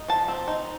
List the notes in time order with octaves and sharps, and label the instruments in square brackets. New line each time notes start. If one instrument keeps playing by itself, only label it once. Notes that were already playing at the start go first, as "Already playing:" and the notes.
Already playing: [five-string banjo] D#4
F3 A5
C4
D#4